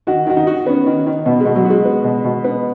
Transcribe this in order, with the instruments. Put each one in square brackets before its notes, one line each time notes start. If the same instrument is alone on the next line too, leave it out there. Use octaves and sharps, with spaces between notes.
[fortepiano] D#3 [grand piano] F#4
[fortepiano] D#3 [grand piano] F#4
[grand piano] D#4
[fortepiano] F#4
[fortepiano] B3 [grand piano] C#4
[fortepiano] D#3
D#3
[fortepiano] B2 [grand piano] B3
[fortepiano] B2 [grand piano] G#3
[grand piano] F#3
[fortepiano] F#4
[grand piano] G#3
[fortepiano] B3
B2
B2
B3